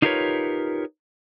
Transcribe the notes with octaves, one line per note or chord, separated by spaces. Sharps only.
D#4 F4 G4 A#4 B4 C#5